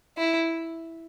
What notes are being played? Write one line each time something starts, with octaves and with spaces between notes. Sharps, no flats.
E4